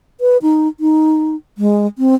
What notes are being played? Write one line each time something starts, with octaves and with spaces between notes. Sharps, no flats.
B4
D#4
D#4
G#3
C4